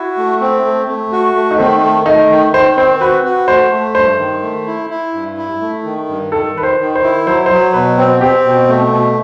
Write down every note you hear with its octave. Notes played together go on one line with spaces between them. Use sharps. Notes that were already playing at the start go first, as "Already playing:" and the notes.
Already playing: E4 F#4
A3
C4
A3
A3
F#4
A3
D#4
D#3 C4
A3
A3 D#4
D#3
D#3 C5
C4 C5
F#4 B4
F#4
A3 C5
A3
G2 C5
D#3
A3
E4
E4
G2
E4
A3
D#3
G2
D#3 A4
D#3 B4
C5
D#3
C5
E4
F#3 C5
F#3 C5
B2 B4
C4
C4 G4
B2
A3
B2